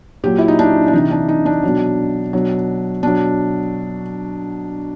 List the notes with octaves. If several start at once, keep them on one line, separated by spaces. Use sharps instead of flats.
A#2 F#3 G4
E4
D#4
D4
D4
C3 E3 D#4
D4
D#4
D4
B2 F#3
B2 F#3
B2 F#3 D4